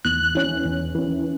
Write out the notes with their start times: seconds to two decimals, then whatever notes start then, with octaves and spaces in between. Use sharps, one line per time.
0.05 E2 F#6
0.35 E3 C#4
0.65 E2
0.95 E3 C#4